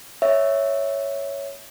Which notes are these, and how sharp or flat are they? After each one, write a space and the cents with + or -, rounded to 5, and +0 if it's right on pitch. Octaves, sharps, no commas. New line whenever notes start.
C#5 +0 E5 -5